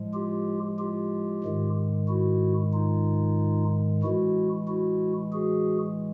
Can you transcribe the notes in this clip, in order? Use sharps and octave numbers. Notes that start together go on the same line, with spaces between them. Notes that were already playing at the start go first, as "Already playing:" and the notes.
Already playing: A2 F3 G#3
F4 G4
F4 G4
G#2 D#3 G#3
E4 F#4
D#4 F4
A2 E3 G#3 E4 F#4
E4 F#4
F#4 G#4